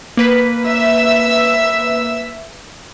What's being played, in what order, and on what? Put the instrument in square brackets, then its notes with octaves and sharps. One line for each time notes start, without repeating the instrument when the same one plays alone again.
[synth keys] A#3 B4 B6
[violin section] E5 E6